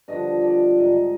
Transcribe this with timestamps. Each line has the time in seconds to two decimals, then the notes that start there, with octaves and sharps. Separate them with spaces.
0.08 G2 D3 F3 D#5
0.42 D5
0.76 G#2 D#3 D#5
0.93 D#5